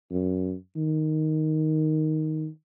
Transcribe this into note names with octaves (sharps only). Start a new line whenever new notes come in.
F#2
D#3